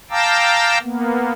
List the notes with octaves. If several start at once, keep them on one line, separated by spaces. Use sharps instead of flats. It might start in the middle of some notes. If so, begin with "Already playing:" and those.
F5 G5 A5 A#5 D6 E6
A#3 B3